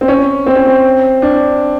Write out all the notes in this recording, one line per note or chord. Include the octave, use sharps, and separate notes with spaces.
C4
C#4
C4
C#4
C4
D4